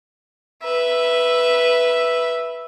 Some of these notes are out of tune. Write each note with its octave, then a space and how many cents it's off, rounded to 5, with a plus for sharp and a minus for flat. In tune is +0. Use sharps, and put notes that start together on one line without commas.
B4 -5 E5 +0